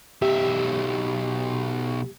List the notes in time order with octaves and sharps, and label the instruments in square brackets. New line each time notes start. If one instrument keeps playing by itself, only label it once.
[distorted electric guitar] B1 E5 [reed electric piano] G4